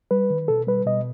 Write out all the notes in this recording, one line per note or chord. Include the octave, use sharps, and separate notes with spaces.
G3 B4
D#3
B2 A4
G3 B4
B2 D#5